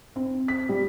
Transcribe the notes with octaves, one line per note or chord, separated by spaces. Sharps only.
C4
B6
G3